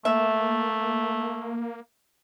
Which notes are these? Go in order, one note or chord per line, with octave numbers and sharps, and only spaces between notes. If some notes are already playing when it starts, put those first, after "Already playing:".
A3 A#3 E5